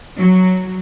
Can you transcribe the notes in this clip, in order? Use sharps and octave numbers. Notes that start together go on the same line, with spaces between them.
F#3